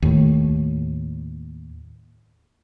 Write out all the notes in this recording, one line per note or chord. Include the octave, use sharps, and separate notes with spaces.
D#2 A2